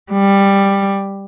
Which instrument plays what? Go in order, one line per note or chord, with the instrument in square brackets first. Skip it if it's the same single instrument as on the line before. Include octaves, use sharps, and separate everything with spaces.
[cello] G3